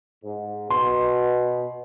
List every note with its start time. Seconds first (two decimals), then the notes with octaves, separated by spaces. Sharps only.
0.24 G#2
0.70 B2 C6